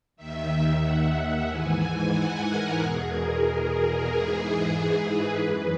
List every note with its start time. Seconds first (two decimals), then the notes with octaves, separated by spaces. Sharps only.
0.17 D#2 D#3 E5
0.81 F#5
1.47 G#2 E3 G#5
2.12 F#5
2.45 A#4
2.77 E2 B2 G#4
3.10 A#4
3.43 A#4
4.08 G#2 E3 G#4
5.07 B4
5.39 F#2 E3 B4